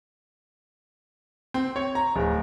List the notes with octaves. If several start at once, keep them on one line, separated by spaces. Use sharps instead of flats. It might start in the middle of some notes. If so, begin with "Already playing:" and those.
C4
C#5
A#5
D1